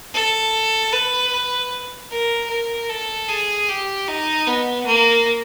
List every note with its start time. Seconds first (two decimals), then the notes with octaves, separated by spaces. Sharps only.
0.14 A4
0.93 B4
1.32 B4
2.11 A#4
2.50 A#4
2.90 A4
3.29 G#4
3.69 G4
4.08 D#4
4.47 B3
4.86 A#3